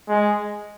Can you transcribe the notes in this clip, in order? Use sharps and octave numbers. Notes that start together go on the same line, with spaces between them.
G#3